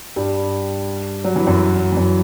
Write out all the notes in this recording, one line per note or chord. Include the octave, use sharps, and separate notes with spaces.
G2 G3
F#3
E3
F#2 F#3
E3
F#2 F#3